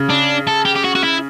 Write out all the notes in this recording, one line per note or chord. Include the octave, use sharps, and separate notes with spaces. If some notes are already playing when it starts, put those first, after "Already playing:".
Already playing: C#3
D4
A4
G4
G4
F#4
F#4
E4